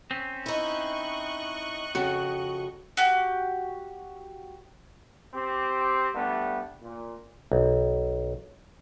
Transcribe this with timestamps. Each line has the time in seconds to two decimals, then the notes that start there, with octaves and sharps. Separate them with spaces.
0.11 C4 C#4
0.46 D#4 E4 D#5 C#6 F#6
1.95 F2 C#3 F#4
2.97 F#4 G4
5.34 C4 G4
6.14 G3 A3 B3 D4
6.82 A#2
7.52 B1